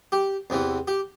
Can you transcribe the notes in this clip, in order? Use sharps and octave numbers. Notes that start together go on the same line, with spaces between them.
G4
E2 C3 E3
G4